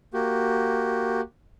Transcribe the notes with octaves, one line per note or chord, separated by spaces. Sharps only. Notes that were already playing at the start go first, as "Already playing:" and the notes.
A#3 F#4 G4